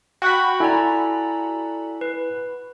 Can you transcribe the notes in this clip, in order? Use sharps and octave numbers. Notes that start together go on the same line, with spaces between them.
F#4 F#5 G5 B5 C#6 G6
E4 A4 D5 G#5 A#5
B4